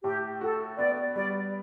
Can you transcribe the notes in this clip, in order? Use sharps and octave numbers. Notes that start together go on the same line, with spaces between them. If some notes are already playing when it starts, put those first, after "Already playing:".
A2 G4
F#4 A4
B3 D5
G3 D5